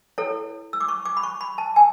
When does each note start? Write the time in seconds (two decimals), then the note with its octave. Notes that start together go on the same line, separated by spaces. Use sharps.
0.18 E4 A4 C#5
0.73 E6
0.81 D6
0.88 C#6
1.05 D6
1.17 B5
1.23 C#6
1.41 B5
1.58 A5
1.76 G#5